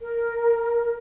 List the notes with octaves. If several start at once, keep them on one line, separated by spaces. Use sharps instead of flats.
A#4